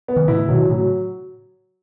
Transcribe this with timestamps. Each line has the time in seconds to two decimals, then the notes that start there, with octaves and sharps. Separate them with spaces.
0.08 B3
0.16 D#3
0.28 A2 C#3 E4
0.49 B2 D#3 F#3
0.69 A2 C#3 F#3